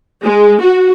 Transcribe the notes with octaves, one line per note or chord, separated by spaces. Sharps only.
G#3
F#4